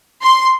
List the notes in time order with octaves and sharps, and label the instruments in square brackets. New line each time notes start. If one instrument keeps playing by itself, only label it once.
[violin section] C6